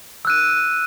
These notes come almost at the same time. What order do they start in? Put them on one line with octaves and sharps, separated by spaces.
E6 F#6 D#7